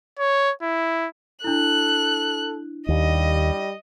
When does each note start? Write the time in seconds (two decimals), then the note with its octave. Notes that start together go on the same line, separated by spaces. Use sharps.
0.19 C#5
0.62 E4
1.44 D4 E4 A4 F#6
2.88 D#2 G3 D#5